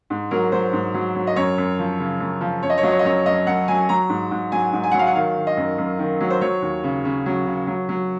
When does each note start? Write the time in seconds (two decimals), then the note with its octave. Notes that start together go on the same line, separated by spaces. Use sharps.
0.10 G#2
0.31 F#3 A#4
0.52 F#3 C5
0.73 G#2
0.94 F#3
1.15 F#3
1.27 D#5
1.36 F#2 C#5
1.58 F#2
1.79 F3
1.99 C#3
2.20 F#2
2.41 F3
2.63 F#2 C#5
2.70 D#5
2.78 C#5
2.83 F#3 D#5
2.92 C#5
2.99 D#5
3.05 F#2 C#5
3.26 F#2 D#5
3.47 F#2 F#5
3.68 F#3 G#5
3.89 F#3 A#5
4.09 G#2
4.31 G#2
4.52 F#3 G#5
4.73 G#2
4.84 G#5
4.91 F#3 F#5
4.99 F5
5.07 F#5
5.15 D#3 F5
5.37 D#3
5.47 D#5
5.57 F#2
5.78 F#2
5.99 D#3
6.20 F#3
6.30 C5
6.41 F#3 C#5
6.62 D#2
6.83 C#3
7.05 C#3
7.26 F#3
7.46 C#3
7.67 F#3
7.89 F#3